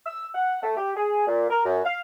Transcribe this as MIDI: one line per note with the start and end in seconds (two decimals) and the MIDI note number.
0.06 0.27 88
0.34 0.61 78
0.63 0.75 57
0.77 0.91 67
0.97 1.27 68
1.27 1.47 46
1.50 1.62 70
1.65 1.80 42
1.85 2.01 77